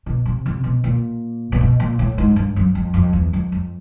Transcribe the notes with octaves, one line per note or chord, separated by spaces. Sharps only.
B2
C3
C3
B2
A#2
A#2
B2
A#2
A2
G#2
G2
F#2
F2
F2
E2
F2
F2